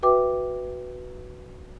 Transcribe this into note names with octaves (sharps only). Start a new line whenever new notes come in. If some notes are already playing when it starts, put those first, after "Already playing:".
F#4 B4 E5 G5 D6